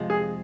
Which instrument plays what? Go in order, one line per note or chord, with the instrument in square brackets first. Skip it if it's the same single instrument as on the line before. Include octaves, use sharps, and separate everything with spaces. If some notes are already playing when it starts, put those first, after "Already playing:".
Already playing: [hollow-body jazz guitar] F2 C3 F3 G#3
[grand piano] G#4